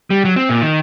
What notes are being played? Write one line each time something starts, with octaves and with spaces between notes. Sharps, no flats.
G3
F#3
C4
A#2
D#3